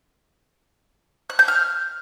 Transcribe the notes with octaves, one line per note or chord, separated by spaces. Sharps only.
F#6
G6
F6